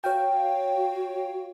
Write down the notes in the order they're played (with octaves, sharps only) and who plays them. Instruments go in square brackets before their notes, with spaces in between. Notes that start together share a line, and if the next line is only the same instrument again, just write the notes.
[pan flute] F#4 [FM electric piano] C#5 F5 G5